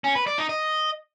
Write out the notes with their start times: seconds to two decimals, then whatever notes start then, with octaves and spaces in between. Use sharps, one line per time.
0.04 C#4
0.15 B4
0.27 D5
0.38 D#4
0.49 D#5